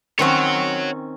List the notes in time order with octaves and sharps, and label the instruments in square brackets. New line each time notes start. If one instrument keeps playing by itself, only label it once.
[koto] D#3 C4 C#4 [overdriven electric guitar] C#5 F#5